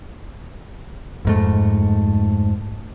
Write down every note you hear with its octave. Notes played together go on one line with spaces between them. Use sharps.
F2 G#2 A3